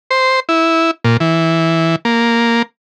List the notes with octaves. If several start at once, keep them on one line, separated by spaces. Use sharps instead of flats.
C5
E4
A#2
E3
A#3